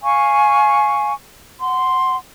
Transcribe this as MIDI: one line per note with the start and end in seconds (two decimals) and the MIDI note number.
0.03 1.13 77
0.03 1.13 80
0.03 1.13 85
1.60 2.16 78
1.60 2.16 84